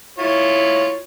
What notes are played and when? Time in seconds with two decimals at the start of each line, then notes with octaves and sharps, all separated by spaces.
0.19 E4 F4 C#5